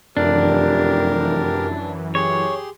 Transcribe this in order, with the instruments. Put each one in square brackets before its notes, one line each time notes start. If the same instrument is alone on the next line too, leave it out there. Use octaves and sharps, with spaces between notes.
[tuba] F1 [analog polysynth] F#2 E3 [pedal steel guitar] D4 [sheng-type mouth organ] G4 A#4
[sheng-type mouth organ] G4 G#4 C6 [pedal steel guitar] C#5